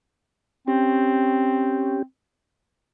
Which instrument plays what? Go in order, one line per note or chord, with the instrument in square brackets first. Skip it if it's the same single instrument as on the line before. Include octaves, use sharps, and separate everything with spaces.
[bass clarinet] C4 [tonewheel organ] C#4 G4